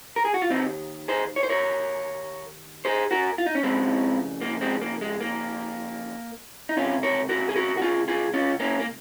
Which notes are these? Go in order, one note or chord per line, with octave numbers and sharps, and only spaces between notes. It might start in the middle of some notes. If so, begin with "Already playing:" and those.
A#4
G#4
F#4
F4
D#2 D#3 C4 D#4
G#4 C5
C#5
C5
A#4 C#5
G#4 C5
F#4 A#4
F4
D#4
C#4
F2 C#3 G#3 C4
A#3
G#3 C4
A#3
G#3
A#3
D#4
C#2 C3 D#3 C#4 F4
A#4 C#5
F#4 A#4
G#4
F#4 A#4
F#4
F4 G#4
F4 G#4
C#4 F4
A#3 C#4
A#3